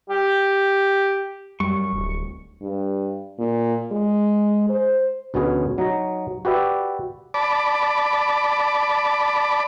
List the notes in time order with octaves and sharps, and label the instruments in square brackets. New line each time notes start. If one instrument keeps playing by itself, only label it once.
[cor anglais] G4
[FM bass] F#2 [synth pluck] G3 [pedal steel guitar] C#6
[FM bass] D1
[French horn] G2
A#2
G#3
C5
[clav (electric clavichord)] D2 B2 B3 C#4 G#4 C#5
F#3 D#4 A#5
F#4 G4 B4 D5 E5
[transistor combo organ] D5 A5 B5 D6